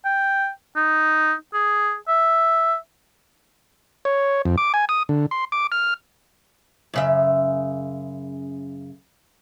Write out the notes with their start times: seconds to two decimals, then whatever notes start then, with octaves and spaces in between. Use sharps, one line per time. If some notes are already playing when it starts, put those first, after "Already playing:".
0.05 G5
0.76 D#4
1.54 G#4
2.08 E5
4.05 C#5
4.45 F2
4.58 D6
4.74 G#5
4.89 D#6
5.09 D3
5.31 C6
5.52 D6
5.72 F6
6.94 F#2 C#3 E5